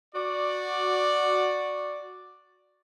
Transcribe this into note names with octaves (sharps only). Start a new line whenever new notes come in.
F#4 D5